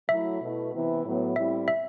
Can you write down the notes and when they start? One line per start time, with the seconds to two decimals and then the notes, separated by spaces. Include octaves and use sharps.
0.09 F#3 A3 E4 E5
0.41 B2 A3 E4
0.73 C3 E3 B3 E4
1.04 A2 F#3 B3
1.36 A2 G3 C4 E4 E5
1.68 E5